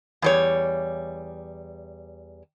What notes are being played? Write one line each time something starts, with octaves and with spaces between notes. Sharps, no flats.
E2 G3 C#5